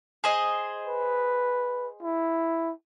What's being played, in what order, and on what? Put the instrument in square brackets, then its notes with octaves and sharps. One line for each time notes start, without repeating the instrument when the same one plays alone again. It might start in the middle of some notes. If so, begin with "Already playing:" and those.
[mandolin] G#4 C5 D#5
[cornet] B4
E4